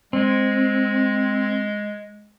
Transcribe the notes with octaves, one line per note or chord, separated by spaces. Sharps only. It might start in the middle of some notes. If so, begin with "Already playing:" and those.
G#3 C4